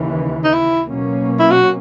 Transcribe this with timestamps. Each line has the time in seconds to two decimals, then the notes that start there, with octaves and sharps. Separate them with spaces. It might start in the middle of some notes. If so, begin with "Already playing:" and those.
Already playing: D#2 C#3 E3
0.44 D#4
0.53 E4
0.86 B2 F#3 A#3 C#4
1.39 E4
1.51 F#4